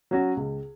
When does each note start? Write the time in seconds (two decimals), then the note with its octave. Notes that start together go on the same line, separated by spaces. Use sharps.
0.11 F#3 C#4 F#4
0.37 C#2